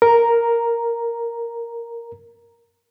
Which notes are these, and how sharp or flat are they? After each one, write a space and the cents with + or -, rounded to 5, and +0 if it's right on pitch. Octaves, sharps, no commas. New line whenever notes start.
A#4 +0 A#5 +0